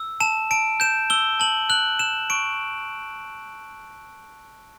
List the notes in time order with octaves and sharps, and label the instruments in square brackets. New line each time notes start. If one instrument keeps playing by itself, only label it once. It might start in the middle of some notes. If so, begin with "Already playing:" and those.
Already playing: [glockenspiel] E6
A5 E7
A5 D7
G6 E7
E6 G7
A5 F#7
F#6 F#7
F#6 E7
C#6 D7